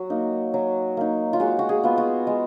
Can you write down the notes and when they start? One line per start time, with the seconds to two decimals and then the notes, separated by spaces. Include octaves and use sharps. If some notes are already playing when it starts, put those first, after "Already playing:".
Already playing: F#3 F#4
0.10 A#3 D#4
0.54 F#3
0.97 A#3 D#4
1.33 F4
1.40 G#3 F#4
1.59 F#4
1.69 G#4
1.83 B3 F4
1.98 F#4
2.27 G#3